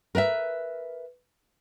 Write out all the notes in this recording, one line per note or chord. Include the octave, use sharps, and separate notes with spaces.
A#4 B4 D#5 E5